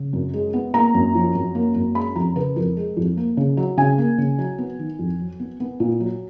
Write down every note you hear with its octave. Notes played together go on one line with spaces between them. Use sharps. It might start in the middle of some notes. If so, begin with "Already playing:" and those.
Already playing: C#3
F#2
G#3
B3
A#3 A#5
F#2
F3
F#2
A#3
F#2
G#3 B5
F2 A#5
C#3 B4
F2 A#4
G#3
F2
A#3
C#3
F#3
C#3 G#5
A#3
C#3
F#3
B3
D#3
F2
F#3
B3
B3
A#2
F#3